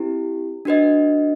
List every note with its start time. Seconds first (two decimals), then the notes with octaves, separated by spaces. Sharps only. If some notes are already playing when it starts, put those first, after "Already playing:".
Already playing: C4 E4 G4
0.65 D4 F#4 B4 D#5